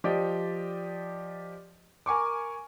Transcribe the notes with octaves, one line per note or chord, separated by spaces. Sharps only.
F3 G4 D5 D#5
A#4 G#5 C#6 D6